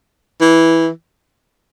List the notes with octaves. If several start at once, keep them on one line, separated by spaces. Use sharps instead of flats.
E3